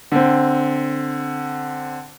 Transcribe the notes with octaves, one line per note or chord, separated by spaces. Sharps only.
D3 C4